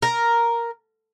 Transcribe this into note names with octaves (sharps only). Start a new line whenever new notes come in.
A#4